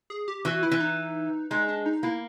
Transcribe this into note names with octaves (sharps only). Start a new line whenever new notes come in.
G#4
G4
E3 F#4
E4
E3
D#4
G#3 D#4
D4
D#4
A#3 E4